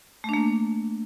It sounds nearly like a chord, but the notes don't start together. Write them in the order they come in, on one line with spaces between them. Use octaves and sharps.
A3 D4 A#3